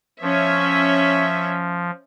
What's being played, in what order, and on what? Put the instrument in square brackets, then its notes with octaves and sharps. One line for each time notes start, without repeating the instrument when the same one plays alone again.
[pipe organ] F3 [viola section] C#4 C#5 E5